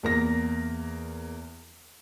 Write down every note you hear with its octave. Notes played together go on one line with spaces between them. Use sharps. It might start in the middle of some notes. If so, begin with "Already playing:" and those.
E2 A#3 A#6